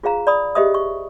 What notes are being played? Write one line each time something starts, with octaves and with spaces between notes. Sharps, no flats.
F4 G#4 C5 F5 A#5
D5 B5 D#6
G4 G#4 C5 D#5 E5 D#6
C#6